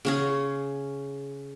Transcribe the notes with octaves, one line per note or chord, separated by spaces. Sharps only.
C#3 C#4 G#4